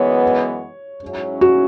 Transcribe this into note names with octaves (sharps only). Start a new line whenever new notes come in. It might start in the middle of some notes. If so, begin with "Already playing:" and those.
Already playing: F#2 E3 G#3 B3 C#5
G#2 F#3 C#4 E4
F#4